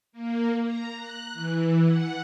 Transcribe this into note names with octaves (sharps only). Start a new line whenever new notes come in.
A#3
A#5
F#6
E3
F#5